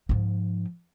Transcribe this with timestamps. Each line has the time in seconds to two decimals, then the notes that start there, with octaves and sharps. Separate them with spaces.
0.09 G#2 F3